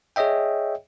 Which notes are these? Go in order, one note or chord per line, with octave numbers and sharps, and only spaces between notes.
G#4 C#5 D#5 E5 G5